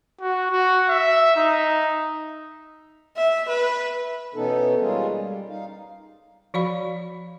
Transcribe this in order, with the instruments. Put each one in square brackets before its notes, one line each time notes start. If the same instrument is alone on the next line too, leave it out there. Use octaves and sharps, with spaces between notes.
[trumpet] F#4
F#4
E5
D#4
[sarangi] E5
B4
[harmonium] B2 E3 B3 C#4 D#4 A4
G3 G#3 A#3 C#4 F4 G#4
G3
D#4 F5
[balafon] F3 F#4 D5 F5 B5